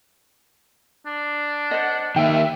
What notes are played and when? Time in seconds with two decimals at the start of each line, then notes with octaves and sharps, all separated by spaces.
1.06 D4
1.71 C5 D#5 F#5
2.16 D#3 A#3 E5 G5